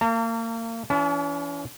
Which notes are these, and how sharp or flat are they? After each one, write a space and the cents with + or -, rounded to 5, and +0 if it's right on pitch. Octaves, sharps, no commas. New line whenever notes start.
A#3 -35 A#5 -45
E3 +25 C#4 +45 A5 -25